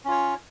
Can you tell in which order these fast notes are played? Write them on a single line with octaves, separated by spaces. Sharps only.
C#4 F4 C#5